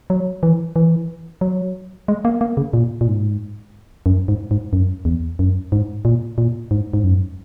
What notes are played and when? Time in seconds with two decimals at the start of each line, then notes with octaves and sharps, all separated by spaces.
0.10 F#3
0.43 E3
0.76 E3
1.41 F#3
2.08 G#3
2.25 A#3
2.41 A#3
2.57 C#3
2.73 A#2
3.01 A#2
3.08 G#2
4.06 F#2
4.28 G#2
4.51 G#2
4.73 F#2
5.05 E2
5.39 F#2
5.72 G#2
6.05 A#2
6.38 A#2
6.71 G#2
6.93 G#2
7.04 F#2